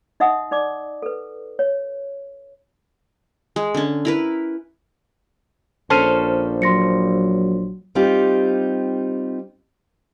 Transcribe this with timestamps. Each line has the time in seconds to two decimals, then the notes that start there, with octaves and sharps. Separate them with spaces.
0.20 D#4 D#5 E5 F#5 D#6
0.51 D#4 D5 D6
1.02 A4 B4
1.59 C#5
3.56 G#3
3.74 D3 C#4
4.05 E4 A#4 B4
5.90 A#1 C#4 A4 C5 A5 F6 D#7
6.62 F#3 C6 A#6 C#7
7.95 G3 C4 D#4 F4 G4